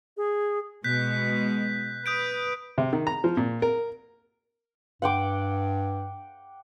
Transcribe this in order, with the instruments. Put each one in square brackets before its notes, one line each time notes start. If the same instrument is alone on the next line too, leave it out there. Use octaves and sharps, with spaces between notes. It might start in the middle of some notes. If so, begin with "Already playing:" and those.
[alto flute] G#4
[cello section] B2 G#3 [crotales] F#6 G6 B6
[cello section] B4 [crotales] D#6 G6 D7
[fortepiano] C3
D#3
A#5
F3
A#2
A#4
[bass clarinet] G2 [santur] F#5 G5 D6